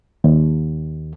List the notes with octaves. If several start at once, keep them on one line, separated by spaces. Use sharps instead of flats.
D#2